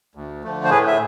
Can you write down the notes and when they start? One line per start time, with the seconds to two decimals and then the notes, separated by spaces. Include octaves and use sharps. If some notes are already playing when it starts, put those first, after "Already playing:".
0.15 D2
0.44 D3 F3 A3
0.64 C5
0.70 A2 G#4 B4
0.87 E5